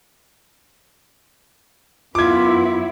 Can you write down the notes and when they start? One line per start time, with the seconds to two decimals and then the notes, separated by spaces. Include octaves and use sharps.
2.15 F#2 B3 E4 F4 D6 G#6